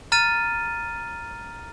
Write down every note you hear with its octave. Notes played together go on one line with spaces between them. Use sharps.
A#5 F6 A6 D#7